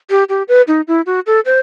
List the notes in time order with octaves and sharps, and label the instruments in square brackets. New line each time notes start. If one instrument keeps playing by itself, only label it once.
[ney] G4
G4
B4
D#4
E4
F#4
A4
C5